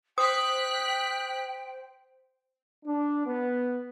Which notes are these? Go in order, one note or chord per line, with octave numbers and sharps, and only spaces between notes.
C5 G5 D#6 F#6 B6
D4
B3